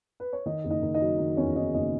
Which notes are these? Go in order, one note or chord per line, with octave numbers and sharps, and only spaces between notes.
B4
C#5
D#3 D#4 D#5
F#1
D#4 D#5
D#3
D#4 D#5
F#3
D#3
E2 C#4 C#5
E2 D#4 D#5
F#1 D#4 D#5